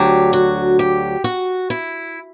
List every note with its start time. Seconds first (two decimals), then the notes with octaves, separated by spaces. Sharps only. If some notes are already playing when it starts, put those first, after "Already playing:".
Already playing: D2 D3 F#3 G4
0.33 F#4
0.79 G4
1.24 F#4
1.70 E4